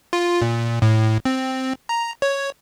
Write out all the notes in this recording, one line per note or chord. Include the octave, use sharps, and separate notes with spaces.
F4
A#2
A2
C4
A#5
C#5